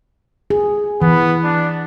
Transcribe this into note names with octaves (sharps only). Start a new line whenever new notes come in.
G#4
E3 B3
D4